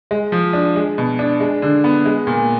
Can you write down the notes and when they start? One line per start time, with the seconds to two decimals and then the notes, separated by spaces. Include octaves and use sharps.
0.11 G#3
0.32 F3
0.53 D4
0.76 G#3
0.98 B2
1.19 D4
1.40 G#3
1.62 D3
1.84 B3
2.06 G#3
2.27 A#2